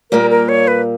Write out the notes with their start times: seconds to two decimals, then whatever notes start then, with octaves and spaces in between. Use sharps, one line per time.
0.11 A#2 G3 A#3 A#4
0.30 A#4
0.49 C#5
0.68 B4